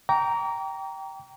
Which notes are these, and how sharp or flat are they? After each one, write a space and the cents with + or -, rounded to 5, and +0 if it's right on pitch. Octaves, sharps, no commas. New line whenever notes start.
G5 -10 A#5 +0 D6 -45